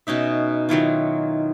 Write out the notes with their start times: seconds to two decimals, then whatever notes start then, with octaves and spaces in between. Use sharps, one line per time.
0.07 B2 C#4 D#4 E5
0.69 D#3 F#3 E4 F4